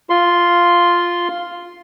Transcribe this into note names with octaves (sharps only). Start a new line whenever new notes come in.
F4 C6